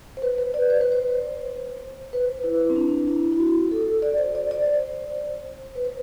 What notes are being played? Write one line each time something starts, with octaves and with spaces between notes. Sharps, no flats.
C5
B4
B4
D5
C5
B4
C5
B4
E4
C4
D4
E4
E4
F#4
A4
D5
C5
D5
D5
C5
B4
C5